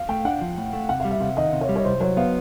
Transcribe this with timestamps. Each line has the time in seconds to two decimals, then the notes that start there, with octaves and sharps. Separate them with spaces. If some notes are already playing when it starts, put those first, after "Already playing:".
Already playing: F5
0.09 A3 G5
0.25 D4 F#5
0.41 F3
0.57 A2
0.73 A3
0.89 C3 F#5
1.00 G3 F5
1.11 E5
1.21 C3 F5
1.37 D#3 D#5
1.53 C3
1.61 C#5
1.69 G3
1.76 C#5
1.85 C2 C5
2.01 F#3 C#5
2.17 B3 F5